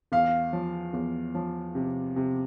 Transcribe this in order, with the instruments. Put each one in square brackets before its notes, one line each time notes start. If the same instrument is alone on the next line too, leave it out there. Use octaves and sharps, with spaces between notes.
[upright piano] E2 F5
F3
E2
F3
C3
C3